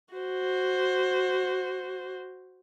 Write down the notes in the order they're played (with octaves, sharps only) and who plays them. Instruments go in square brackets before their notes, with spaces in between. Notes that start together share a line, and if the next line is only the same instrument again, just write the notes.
[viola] F#4 C5